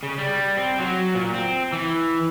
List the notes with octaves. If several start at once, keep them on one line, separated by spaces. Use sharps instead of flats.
C#3
G3
C4
F#3
A#2
C4
E3